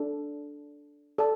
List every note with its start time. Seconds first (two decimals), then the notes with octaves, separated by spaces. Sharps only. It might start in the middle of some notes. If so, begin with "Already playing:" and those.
Already playing: D4 A4
1.18 A4 D5 A5